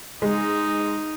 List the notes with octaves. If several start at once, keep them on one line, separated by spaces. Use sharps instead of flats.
G#3 D#4